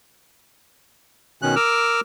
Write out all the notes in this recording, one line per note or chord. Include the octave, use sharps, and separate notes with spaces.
B2 D#3 C#4 F#6
A#4 D6 E6 F6